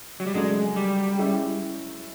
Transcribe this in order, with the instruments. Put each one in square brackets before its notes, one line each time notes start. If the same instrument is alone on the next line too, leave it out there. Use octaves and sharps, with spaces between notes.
[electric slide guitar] F#3
G3
[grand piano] C#3 F#3 A3 D4 [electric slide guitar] G#3
[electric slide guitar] G3
[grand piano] G#3 C#4 E4